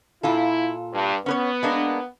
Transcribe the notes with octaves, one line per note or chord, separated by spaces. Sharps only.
A#2 E4 F4 A4
G2
B3 C#4 B4 C#5
G#3 A#3 D4